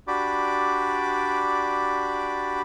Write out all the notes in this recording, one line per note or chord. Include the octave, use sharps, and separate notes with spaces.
D4 F#4 G4 D5 B5 D6